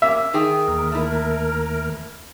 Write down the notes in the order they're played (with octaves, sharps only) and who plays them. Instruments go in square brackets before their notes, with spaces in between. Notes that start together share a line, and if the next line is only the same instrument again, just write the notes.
[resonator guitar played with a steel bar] A#3 C#4 [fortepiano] E5
[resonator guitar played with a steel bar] D#3 G#4 G5
[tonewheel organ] D#2 A#4
[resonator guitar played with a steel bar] A3 E4